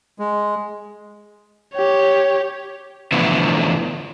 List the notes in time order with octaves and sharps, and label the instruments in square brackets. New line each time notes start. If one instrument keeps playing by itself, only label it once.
[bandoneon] G#3
[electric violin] G4 C#5
[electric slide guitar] D3 E3 F3 A3 B3 E4